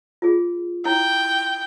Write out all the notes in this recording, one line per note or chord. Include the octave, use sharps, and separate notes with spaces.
F4 G#4
E4 G5